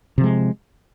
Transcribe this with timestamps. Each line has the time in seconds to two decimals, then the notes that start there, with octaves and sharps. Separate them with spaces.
0.18 C3
0.21 F3
0.24 G#3